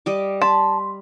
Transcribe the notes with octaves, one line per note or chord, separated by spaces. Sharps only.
G3 D#5 D6
A5 B5 C6